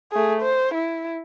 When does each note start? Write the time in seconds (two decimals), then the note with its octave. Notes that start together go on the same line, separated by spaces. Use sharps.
0.12 A3 G#4
0.41 C5
0.74 E4